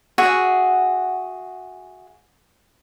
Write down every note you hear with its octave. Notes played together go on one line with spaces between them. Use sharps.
F#4 G#4 E5 F#5